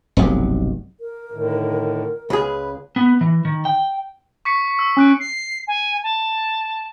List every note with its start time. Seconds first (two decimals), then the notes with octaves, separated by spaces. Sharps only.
0.17 F1 B1 G2
0.99 A#4
1.32 A2 D3 D#3
2.30 C#2 G#4 B4
2.96 B3
3.21 E3
3.45 D#3
3.65 G5
4.45 C#6 B6 C#7
4.79 E6
4.97 C#4 E6 F#6 D7
5.20 C7
5.67 G#5
6.03 A5